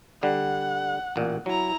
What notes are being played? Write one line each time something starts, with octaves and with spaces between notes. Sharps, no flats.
D3 G3 F#5
A1 A#2
F#3 E4 A#5